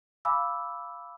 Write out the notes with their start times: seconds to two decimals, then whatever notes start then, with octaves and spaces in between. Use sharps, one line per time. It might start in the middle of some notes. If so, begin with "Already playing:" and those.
0.25 F5 G#5 B5 D6 E6